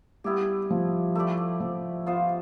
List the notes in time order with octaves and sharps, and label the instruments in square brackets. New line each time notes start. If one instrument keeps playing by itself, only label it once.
[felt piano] G3 [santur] B3 E4 G4
[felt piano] F3
[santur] A3 E4 G4 D5
[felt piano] F3
[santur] B3 F4 C5 F5